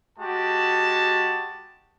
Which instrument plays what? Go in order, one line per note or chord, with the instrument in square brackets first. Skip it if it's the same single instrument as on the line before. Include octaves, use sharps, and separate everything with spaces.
[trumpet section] G#3 F#4 G4 A5